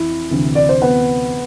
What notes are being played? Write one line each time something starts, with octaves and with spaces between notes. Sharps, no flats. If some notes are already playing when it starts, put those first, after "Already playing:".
Already playing: F2 E3 E4
D2 C3 E3
D5
C5
B3 B4